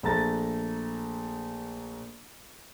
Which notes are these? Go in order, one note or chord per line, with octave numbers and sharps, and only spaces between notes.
A#1 A3 A5 A#5 A6